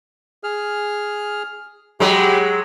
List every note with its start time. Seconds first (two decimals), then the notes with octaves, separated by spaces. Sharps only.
0.44 G#4 F6
2.00 F#3 G#3 G4 B5